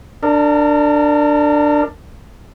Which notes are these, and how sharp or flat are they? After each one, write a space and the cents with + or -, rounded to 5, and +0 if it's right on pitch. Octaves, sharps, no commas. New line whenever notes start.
D4 +10 A#4 -30